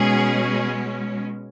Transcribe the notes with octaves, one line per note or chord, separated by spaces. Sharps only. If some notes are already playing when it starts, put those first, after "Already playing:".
Already playing: B2 G#3 C#4 G#4